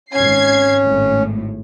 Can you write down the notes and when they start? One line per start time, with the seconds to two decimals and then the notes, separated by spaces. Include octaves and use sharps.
0.13 G#1 C#4 G#6 C7
0.84 G#1 A2